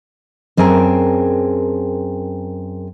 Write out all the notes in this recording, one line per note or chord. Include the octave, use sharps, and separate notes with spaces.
F#2 C4 G#4 A#4 G5 A5